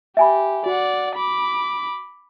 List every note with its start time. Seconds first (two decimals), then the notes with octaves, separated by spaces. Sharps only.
0.17 G4 E5 G#5 B5
0.66 F#4 D5 F#5
1.16 B5 D6